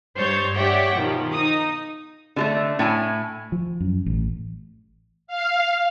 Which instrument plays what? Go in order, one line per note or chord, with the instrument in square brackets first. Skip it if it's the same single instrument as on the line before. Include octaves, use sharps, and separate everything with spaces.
[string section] G2 C5 C#5 G6 A6
G4 C#5 D5 E5 F#5 G5
B2 D#3 F3 G4
D#4 D#6
[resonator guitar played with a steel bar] D3 G3 A3
A2 E4 G#5
[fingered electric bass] F3
F#2
A1
[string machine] F5